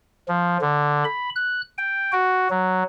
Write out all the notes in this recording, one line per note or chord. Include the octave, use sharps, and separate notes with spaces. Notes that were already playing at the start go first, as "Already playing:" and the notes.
F3
D3
B5
F#6
G5
F#4
F#3